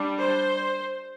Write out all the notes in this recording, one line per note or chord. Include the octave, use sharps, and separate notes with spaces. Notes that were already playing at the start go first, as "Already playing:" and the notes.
Already playing: G3 D4
C5